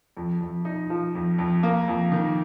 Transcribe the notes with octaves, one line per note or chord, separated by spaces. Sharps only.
F2
F2
D#4
F3
F2
F2
A#3
F2
D#3